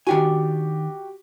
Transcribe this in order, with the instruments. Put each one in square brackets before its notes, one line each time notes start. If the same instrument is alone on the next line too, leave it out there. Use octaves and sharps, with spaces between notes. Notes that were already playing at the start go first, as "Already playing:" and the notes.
[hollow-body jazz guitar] D#3 D4 G#5 [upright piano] F#4 G4